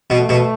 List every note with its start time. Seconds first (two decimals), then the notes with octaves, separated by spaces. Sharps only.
0.10 B2
0.19 A3
0.29 B2